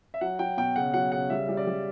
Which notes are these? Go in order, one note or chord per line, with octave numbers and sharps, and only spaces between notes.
E5
F#3 F#5
F#3 G5
B2 G5
C#3 F#5
F#3 F#5
C#3 F#5
G3 E5
G3
D5
G3